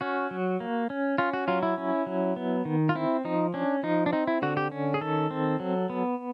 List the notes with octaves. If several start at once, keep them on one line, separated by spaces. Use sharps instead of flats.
C#4 F#4
F#3
A#3
C#4
C#4 F4
F#4
F#3 F4
E4
C#4
F#3
B3
D#3
F4
C4 E4
F3 D#4
C#4 D4
F3 D#4
D4
C4 D#4
E4
D3 F#4
G4
C#4
G#4
D#3 A4
C4
F#3
B3